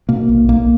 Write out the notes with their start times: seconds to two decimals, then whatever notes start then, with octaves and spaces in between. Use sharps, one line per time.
0.09 B2 A#3
0.29 B1
0.49 B1 A#3